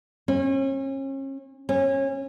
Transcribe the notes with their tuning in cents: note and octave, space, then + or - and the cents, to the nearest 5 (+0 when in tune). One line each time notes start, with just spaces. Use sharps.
C#4 -35
C#4 -25